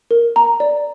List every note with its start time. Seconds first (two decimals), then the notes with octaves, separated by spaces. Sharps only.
0.11 A#4
0.36 A#5
0.60 D5